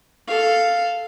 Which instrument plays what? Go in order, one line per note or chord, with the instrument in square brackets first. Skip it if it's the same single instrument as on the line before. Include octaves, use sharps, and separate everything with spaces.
[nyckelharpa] A4 F5